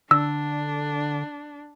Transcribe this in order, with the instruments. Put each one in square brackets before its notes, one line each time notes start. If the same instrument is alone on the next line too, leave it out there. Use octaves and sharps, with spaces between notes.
[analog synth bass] D3 [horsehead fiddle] D4 [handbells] E6